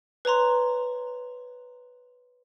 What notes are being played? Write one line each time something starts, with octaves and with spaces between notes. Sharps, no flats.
B4 C#5 A#5 C6